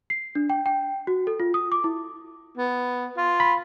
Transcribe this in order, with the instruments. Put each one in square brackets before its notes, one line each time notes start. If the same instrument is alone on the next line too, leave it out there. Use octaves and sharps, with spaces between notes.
[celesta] C7
D4
G5
G5
F#4
A4
F4
D#6
D6
E4
[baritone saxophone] B3
F4
[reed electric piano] B5